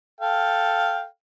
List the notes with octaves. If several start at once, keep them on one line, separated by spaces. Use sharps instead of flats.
A4 F5 G5